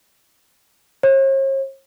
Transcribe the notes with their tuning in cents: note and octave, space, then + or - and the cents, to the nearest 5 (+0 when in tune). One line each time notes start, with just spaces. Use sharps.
C#5 -45